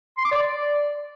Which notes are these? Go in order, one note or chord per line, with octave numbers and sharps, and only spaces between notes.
C6
D6
D5